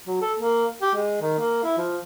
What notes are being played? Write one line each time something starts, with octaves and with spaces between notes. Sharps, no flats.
F#3
A4
A#3
G4
G#3
D#3
A#3
E4
F3